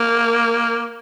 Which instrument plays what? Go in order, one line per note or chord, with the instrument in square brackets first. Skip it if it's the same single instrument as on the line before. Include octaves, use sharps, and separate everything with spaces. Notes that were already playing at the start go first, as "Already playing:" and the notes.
Already playing: [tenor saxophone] A#3